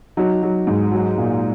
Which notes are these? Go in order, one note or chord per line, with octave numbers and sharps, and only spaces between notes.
F#3 D#4
F#3
G#2
F#3
A#2